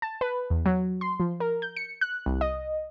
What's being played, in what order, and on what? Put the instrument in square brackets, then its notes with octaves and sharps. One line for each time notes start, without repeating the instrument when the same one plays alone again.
[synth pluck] A5
B4
E2
F#3
C6
F3
A#4
G6
C#7
F#6
C2
D#5